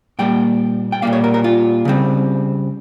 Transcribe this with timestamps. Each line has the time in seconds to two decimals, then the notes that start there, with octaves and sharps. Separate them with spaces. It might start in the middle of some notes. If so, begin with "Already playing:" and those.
0.19 A#2 G3 A#3 G5
0.92 G5
1.02 A#2 G3 A#3 F5
1.13 C#5
1.24 A#4
1.34 A#4
1.44 F4
1.85 C#3 G3 C4